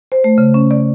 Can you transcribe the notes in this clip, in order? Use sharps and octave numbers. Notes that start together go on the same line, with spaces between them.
C5
A3
C#3
C#4
D5